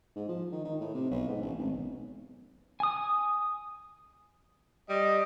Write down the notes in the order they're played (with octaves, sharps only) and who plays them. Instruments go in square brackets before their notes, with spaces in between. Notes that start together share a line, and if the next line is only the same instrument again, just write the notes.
[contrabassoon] G#2
F3
D#3
D#3
A2
C3
B1
G#2
A1
G#1
B1
[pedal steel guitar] G#5 D#6
[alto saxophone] G3 [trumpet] D#5